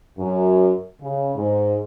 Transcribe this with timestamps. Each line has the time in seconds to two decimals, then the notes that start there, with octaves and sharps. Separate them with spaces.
0.18 F#2
1.01 C#3
1.36 G#2